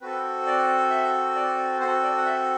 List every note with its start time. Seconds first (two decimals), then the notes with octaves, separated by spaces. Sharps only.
0.01 C4 F#4 A4 B4
0.47 D5
0.90 E5
1.36 D5
1.80 C4 F#4 A4 C5
2.03 D5
2.18 F#5
2.25 E5